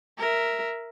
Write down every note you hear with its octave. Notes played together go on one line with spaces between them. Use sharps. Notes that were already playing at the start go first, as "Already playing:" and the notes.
A#4 E5